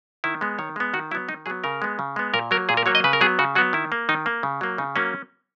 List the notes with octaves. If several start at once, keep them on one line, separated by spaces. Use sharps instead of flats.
D#3 E4
G#3 B3
D#3 C#5
G#3 B3
D#3 F#4
F#3 B3 E4
D#3 D#4
F#3 B3 G#4
C#3 A#4
G#3 B3
C#3
G#3 B3
A#2 A#4
F#3 A#3 A#4
A#2 G#4
A#4
F#3 A#3 C#5
D#5
C#3 B4
A#4
F#3 B3 G#4
C#3 F#4
F#3 B3 F#4
D#3 E4
A#3
D#3 D#4
A#3
C#3
F#3 A#3
C#3 D#4
F#3 A#3 C#4